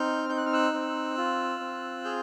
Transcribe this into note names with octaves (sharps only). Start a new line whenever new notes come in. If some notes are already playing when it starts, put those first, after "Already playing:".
Already playing: C4 D#4 F6 G6
D#4 G6
F#6
F6
E6 F#6
C4
F4
C4
G#4 F6 G6